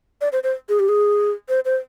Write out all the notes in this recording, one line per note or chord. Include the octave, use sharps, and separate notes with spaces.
D5
C5
C5
G#4
G4
G#4
C5
C5